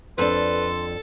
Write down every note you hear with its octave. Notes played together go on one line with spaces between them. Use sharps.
F2 D4 A4 B4 C6